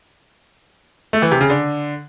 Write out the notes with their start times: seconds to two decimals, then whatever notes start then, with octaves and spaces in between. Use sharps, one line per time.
1.13 A3
1.22 E3
1.31 C3
1.41 C#3
1.50 D3